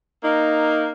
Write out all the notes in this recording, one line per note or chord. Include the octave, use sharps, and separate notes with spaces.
A#3 D#4